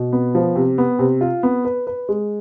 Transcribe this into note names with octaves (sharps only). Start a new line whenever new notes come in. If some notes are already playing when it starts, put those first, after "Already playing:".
Already playing: B2
B3
F3
C3
B3
C3
F4
B3
B4
B4
G#3